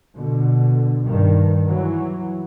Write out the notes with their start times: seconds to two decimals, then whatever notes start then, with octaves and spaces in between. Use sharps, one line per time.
0.14 B2 D3
1.03 G2 D#3
1.66 E3 F#3